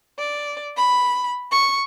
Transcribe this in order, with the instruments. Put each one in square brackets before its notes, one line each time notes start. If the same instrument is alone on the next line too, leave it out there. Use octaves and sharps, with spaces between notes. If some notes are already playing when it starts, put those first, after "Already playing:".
[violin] D5
B5
C#6